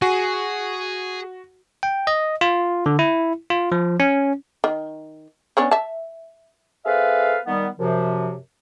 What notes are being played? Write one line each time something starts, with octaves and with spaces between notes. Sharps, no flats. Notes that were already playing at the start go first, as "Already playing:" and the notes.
F#4 G#4 G#5
G5
D#5
F4
D3
E4
F4
F3
C#4
D#3
B3 C#4 D4
E5 A5
C4 G#4 A4 B4 E5 F5
D#3 G3 B3
F#2 C3 F3